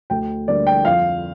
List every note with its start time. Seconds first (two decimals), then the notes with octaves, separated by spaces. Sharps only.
0.10 D2 G5
0.48 D3 G3 A#3 D5
0.67 G5
0.85 F2 F5